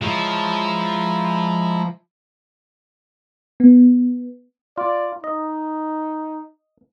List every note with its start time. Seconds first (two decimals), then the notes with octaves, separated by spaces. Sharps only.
0.02 F3 G#3 E4 C#5 A#5
3.60 B3
4.78 F4 D5
5.24 D#4 D#5